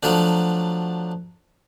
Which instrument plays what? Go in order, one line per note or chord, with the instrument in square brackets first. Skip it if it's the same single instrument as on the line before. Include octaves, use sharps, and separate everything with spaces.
[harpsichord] F3 F#3 A3 D4